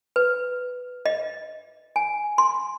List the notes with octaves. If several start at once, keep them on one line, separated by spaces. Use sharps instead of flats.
B4
D#5
G#5
C6